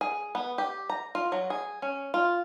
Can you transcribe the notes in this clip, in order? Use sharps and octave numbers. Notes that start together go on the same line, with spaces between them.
G#4
B3
G4
A#5
F4
F#3
G#4
C#4
F4